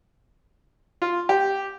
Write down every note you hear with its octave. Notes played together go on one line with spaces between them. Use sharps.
F4
G4